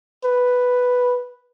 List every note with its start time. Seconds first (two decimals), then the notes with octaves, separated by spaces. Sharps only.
0.24 B4